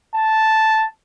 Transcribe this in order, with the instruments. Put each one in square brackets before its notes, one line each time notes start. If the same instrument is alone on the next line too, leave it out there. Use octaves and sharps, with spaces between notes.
[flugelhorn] A5